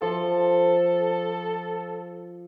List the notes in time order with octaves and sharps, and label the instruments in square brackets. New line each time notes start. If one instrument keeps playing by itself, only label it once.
[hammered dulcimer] F3 [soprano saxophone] A4